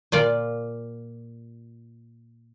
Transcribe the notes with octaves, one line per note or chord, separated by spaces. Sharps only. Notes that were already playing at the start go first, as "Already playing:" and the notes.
A#2 F4 D5